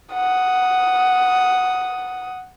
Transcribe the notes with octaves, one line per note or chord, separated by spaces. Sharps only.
F#5 D#6